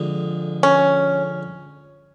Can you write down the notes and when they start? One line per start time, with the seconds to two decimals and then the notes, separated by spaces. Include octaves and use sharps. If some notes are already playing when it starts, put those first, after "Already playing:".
Already playing: F2 D3 G#3
0.63 C#4